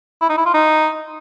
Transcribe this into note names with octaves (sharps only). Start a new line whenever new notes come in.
E4
D#4
E4
F4
D#4